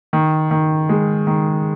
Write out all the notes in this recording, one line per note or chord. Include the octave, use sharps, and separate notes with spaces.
D#3
D#3
G#3
D#3